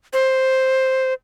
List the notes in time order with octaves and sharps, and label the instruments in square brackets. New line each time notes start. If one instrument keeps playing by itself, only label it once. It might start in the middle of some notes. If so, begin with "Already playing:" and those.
[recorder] C5